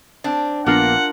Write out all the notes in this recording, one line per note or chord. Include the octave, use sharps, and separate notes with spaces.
C4 D4
A#1 A#3 B3 D4 F4 A#4 F#5